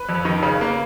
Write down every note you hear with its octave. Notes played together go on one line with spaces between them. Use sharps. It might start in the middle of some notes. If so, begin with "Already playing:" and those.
Already playing: B4
F2
D#3
C#3
A#3